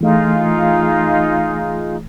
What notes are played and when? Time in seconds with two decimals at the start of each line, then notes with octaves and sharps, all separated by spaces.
0.01 E3 A3 D#4 F4 G#4